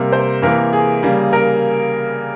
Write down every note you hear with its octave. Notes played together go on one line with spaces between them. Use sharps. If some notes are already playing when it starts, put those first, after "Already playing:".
Already playing: C3 G3 A#3 A#4
C5
C3 E3 A#3 A#4
G#4
C#3 G3 A#3
A#4